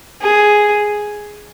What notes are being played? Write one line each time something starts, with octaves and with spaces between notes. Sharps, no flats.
G#4